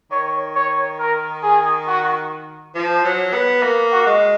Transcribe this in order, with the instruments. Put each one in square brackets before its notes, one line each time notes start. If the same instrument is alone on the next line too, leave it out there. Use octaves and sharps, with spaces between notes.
[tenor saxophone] D#3 [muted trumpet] C#5
[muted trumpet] C#5
A#4
G#4
F#4
[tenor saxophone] F3
F#3
B3
A#3
[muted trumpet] F#4
[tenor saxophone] G#3